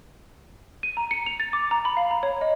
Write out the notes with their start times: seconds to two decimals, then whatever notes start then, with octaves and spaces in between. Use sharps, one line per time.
0.83 D#7
0.97 A#5
1.11 C#7
1.26 F7
1.40 A6
1.53 D6
1.71 A#5
1.85 B5
1.97 F5
2.11 A#5
2.23 C#5
2.41 D#5